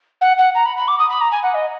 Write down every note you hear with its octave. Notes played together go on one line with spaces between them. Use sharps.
F#5
F#5
A#5
B5
B5
D6
D#6
B5
A#5
G#5
F#5
D#5